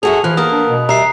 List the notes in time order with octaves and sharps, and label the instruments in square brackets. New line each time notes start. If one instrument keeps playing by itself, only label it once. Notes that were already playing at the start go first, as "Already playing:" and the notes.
[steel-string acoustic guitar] F#2 F#4 A4 [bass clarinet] G#4 [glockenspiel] F7
[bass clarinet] E3 [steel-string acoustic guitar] F3 [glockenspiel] F#6
[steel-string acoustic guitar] A#3 B3 A#4 [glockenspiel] D#6
[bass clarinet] D4
B2
[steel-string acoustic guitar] G3 E5 [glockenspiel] A#5 C7